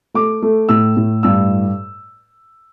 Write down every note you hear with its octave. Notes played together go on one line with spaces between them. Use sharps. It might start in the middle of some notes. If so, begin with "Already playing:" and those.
A3 D6
A3
A2 E6
A2
G2 E6